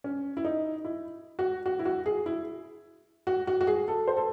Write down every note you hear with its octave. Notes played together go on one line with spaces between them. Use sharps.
C#4
E4
D#4
E4
F#4
F#4
E4
F#4
G#4
E4
F#4
F#4
F#4
G#4
A4
C5
A4